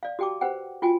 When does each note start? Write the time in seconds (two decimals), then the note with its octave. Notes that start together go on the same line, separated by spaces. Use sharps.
0.03 D5 F5
0.19 F#4 G4 G5 A5 D6
0.41 G4 B4 C5 F#5 G5
0.82 F4 F#4 G5 G#5